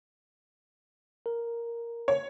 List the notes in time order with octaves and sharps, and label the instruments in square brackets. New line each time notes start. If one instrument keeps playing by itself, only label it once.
[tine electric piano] A#4
[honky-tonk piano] C#5